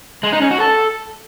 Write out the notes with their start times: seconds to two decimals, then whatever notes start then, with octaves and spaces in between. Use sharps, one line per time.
0.23 G#3
0.32 D#4
0.42 C#4
0.51 F#4
0.60 A4